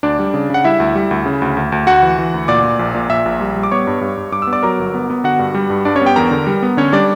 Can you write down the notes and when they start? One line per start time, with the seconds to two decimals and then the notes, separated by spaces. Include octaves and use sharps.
0.03 D2 D4 D5
0.19 G3
0.34 C#3
0.50 C#3 F#5
0.64 G3 E4 E5
0.80 D2
0.95 G3
1.11 D2
1.26 C#3
1.42 D2
1.57 D2
1.72 D2
1.87 D2 F#4 F#5
2.03 E3
2.19 E3
2.34 D2
2.48 A#2 D5 D6
2.63 A#2
2.79 A#1
2.95 A#2
3.09 A#2 E5 E6
3.26 A#1
3.40 G3
3.56 G3
3.63 D6
3.71 B3 C#5 C#6
3.87 G2
4.01 G2
4.17 G2
4.32 G2 D6
4.42 E6
4.47 B3
4.53 D5 D6
4.63 F#3 A#4 A#5
4.79 G1
4.94 B3
5.10 B3
5.24 D3 F#4 F#5
5.39 G2
5.55 G3
5.70 G2
5.85 G2 D4 D5
5.95 C#4 C#5
6.02 B3 G4 G5
6.16 E2 A#4 A#5
6.31 D3
6.47 G3
6.63 B3
6.77 D3 C#4 C#5
6.92 G3 D4 D5